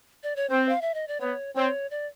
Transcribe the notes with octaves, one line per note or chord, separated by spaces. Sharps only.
D5
C#5
C4 C5
F5
E5
D#5
D5
B3 C#5
C4 C#5
D5